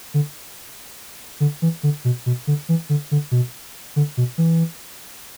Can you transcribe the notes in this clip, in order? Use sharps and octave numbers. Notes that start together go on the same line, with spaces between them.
D3
D3
E3
D3
B2
B2
D3
E3
D3
D3
B2
D3
B2
E3